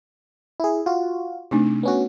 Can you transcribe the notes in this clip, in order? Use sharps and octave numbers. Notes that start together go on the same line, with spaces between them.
E4 G#4
F4 F#4
C3 A3 D4 D#4
B3 C#4 F#4